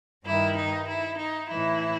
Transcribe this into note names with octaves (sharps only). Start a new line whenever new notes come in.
G2 D#3 E4
D#4
E4
D#4
A2 E3 E4